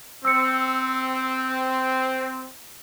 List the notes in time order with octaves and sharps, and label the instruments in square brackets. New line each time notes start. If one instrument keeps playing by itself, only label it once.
[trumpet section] C4 [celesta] E6 C#7